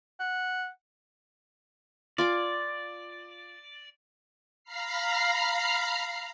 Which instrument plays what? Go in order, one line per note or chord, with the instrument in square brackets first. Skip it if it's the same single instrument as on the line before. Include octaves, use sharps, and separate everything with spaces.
[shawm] F#5
[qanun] F4 G#5 D6 [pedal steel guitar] D5
[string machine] F5 A#5 B5 F6 C7